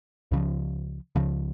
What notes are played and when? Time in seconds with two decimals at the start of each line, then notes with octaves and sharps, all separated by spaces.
0.31 C#2 C#3 F3
1.16 C#2 C#3 F3